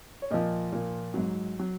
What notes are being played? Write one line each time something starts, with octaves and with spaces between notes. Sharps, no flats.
C#5
A#2 F3 D#5
A#2 F3
G#2 F#3
F#3